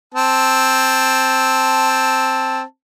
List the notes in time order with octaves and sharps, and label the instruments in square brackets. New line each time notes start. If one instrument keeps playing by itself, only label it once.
[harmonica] C4 A5